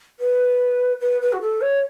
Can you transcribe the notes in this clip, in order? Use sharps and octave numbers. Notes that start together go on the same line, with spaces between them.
B4
B4
B4
F#4
A4
C#5